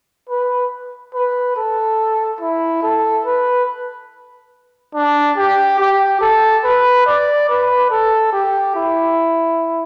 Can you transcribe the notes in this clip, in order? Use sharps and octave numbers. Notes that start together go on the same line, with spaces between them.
B4
B4
A4
E4
A4
B4
D4
G4
G4
A4
B4
D5
B4
A4
G4
E4